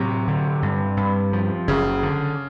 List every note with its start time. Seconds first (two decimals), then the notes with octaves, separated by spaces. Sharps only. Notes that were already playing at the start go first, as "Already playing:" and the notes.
Already playing: A2 C3 F#3
0.28 D3
0.62 G2
0.97 G2
1.33 F3
1.68 F#1 C#3
2.03 D3